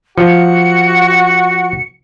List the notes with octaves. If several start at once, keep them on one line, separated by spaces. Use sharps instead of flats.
F3 F#4 C#7